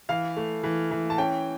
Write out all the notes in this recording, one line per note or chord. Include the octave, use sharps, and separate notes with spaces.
E3 F5
A3
E3
E3
A5
C#4 G5